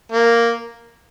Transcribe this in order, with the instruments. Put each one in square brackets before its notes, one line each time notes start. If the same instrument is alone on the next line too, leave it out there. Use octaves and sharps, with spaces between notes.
[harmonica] A#3